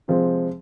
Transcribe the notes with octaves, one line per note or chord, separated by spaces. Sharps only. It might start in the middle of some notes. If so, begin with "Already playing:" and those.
C3 F3 G#3 C4